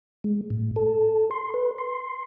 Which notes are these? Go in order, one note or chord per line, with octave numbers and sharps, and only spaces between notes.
G#3
A2
A4
C6
B4
C6